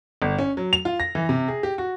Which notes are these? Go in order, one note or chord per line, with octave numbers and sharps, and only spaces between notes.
G1
C#4
F#3
F7
F4
A#6
E3
C3
G#4
G4
F#4